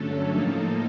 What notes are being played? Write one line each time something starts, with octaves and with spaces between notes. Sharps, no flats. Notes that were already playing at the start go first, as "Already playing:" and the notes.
Already playing: G2 D3 F#3 A3 C#4 A4
A2 F3 A#3 D#4